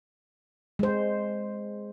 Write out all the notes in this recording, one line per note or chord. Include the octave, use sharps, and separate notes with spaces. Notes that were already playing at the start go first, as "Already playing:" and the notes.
G#3 C5